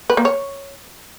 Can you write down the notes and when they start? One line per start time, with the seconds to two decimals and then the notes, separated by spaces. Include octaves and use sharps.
0.10 B4
0.17 A#3
0.25 C#5